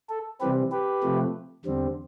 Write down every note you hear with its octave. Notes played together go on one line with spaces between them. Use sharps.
A4
C3 E3 G3 C4 G4 B4
G4 B4
C3 F3 A3
E2 D3 G3 C4